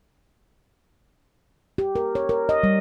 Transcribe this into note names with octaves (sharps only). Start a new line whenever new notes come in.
G4
A#4
C#5
A#4
D#5
G3